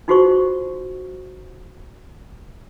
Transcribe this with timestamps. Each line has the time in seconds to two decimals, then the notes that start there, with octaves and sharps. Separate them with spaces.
0.08 D#4 F4 F#4 G#4 C5 C#6